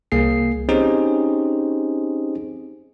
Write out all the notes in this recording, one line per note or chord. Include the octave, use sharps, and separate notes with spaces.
C2 A#3 G#4 C7
C4 C#4 D#4 G4 G#4 C5